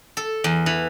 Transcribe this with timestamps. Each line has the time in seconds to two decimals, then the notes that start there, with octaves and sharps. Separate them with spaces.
0.17 A4
0.44 E2
0.66 E3